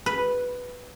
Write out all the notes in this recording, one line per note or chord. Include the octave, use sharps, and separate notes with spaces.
B4